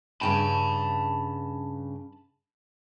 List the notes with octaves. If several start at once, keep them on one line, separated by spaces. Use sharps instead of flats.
G2 C#3 G5 A5 B5